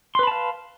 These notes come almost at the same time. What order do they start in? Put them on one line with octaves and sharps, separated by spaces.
C6 B4 B5 A5 F5